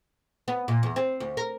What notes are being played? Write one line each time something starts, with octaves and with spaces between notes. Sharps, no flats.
B3
A#2
E2
C4
D2
A#4